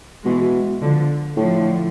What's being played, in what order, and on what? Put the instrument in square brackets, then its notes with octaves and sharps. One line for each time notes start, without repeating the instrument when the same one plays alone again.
[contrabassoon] B2 [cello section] E3 G#3
[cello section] D3 F3
[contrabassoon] A2 [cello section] D3 F3